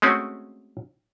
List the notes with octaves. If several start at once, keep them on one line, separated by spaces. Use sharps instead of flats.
G#3 A3 C4 C#4 F#4